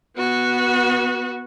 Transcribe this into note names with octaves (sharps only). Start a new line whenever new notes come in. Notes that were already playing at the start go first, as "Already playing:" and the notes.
B3 F#4